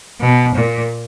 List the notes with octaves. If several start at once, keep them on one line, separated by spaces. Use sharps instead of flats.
B2
A#2